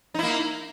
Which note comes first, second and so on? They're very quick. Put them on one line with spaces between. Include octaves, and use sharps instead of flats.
D#4 E4 A#3